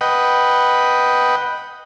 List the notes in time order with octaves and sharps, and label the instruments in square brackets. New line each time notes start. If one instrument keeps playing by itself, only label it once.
[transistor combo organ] B4 D#5 F#5 G5